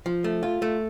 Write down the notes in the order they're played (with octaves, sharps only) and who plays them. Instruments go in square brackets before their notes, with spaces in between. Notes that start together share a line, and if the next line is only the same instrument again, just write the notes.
[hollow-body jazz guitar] F3
A3
F4
A3